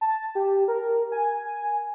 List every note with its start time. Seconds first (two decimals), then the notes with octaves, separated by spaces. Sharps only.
0.01 A5
0.35 G4
0.68 A#4
1.12 G#5